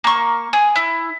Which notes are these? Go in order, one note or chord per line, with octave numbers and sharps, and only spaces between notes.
A#3 C#6
G#4
E4